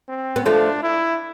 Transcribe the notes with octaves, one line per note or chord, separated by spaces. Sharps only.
C4
B3
F3 A3 D4
E4